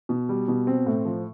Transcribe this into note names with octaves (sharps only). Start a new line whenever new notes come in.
B2
G3
B2
C4
A2
F3